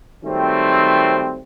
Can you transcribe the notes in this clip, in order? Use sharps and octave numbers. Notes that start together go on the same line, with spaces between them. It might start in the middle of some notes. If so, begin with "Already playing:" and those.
D#3 F#3 G3 A3 C4